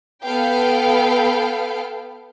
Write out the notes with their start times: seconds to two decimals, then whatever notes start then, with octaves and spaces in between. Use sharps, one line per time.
0.23 B3 A4 B4 F5 G5